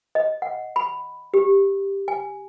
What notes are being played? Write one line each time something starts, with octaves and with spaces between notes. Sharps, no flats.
D#5
F#5
B5
G4
G#5